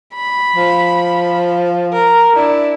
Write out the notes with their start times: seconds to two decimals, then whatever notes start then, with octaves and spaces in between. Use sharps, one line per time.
0.15 B5
0.55 F3
1.93 A#4
2.36 D4 E4